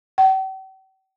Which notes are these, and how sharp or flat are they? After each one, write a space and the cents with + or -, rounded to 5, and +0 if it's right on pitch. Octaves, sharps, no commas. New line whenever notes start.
G5 -45